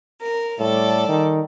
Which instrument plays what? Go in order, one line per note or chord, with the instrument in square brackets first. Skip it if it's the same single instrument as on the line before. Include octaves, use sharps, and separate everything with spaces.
[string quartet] A#4
[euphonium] A2 [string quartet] G3 A4 D5
[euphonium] D#3